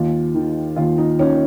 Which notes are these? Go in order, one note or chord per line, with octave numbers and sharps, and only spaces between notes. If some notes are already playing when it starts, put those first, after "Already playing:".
Already playing: D#2 F4
D#3
D#2 F4
D#4
D#3 C#4